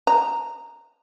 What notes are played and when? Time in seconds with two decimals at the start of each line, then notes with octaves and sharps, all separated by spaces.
0.07 A#5